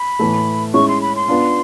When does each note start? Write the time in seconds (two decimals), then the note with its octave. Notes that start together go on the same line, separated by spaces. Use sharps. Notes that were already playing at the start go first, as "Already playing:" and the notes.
Already playing: B5
0.19 A2 E3 A3
0.74 G#3 C#4 E4 C#6
0.88 C6
1.01 B5
1.16 C6
1.28 B3 D4 F4